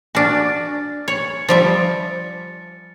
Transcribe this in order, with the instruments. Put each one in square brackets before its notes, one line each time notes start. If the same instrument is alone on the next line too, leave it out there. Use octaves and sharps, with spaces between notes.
[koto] D4 F#4 [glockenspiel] G#5 F6 A6
[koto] C#5 [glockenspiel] C#7
[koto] F3 G3 E5 [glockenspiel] A6